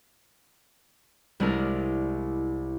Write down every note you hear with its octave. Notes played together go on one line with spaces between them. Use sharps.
C2 G#3 D4 E4 A#4